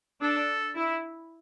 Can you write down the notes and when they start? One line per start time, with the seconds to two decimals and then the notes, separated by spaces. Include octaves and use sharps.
0.22 D4 A4
0.76 E4